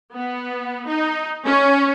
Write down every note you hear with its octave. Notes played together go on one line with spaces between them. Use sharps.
B3
D#4
C#4